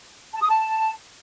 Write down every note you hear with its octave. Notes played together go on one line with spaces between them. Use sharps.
A5
D#6
A5